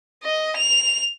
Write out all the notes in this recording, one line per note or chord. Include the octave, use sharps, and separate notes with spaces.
D#5
F7